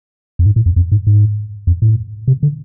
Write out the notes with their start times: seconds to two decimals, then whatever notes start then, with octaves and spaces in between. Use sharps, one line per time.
0.39 F2
0.46 G#2
0.56 A2
0.66 F2
0.76 F2
0.92 G#2
1.07 G#2
1.67 F2
1.82 A2
2.28 C3
2.43 D3